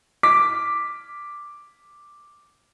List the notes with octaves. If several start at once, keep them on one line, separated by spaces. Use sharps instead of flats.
D6 B6